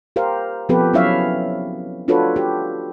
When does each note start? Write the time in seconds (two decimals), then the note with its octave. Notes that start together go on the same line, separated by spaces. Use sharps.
0.16 G4 A#4 C5 F5
0.69 F3 B3 C4 G4 A4 B4
0.93 F#3 C#4 E4 C#5 E5 F5
2.08 D4 F4 F#4 A4 B4 C#5
2.36 G4